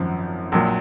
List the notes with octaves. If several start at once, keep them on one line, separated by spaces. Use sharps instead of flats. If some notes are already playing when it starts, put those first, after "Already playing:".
Already playing: G#1 F#2 F3
A#1 A#2 F#3